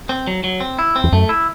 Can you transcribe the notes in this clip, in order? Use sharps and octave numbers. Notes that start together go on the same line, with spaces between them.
C4
F#3
F#3
C4
E4
C4
E2
F#2 A3
E4